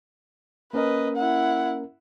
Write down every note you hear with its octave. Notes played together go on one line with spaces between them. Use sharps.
A#3 C#4 A#4 B4 D#5
E4 F#5